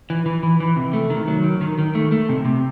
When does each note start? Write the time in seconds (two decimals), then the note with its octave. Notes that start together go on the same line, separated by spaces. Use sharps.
0.10 E3
0.26 E3
0.43 E3
0.60 E3
0.76 C3
0.93 A3
1.10 D#3
1.28 F#3
1.44 D#3
1.61 D#3
1.79 D#3
1.95 A3
2.12 A3
2.29 C3
2.45 C3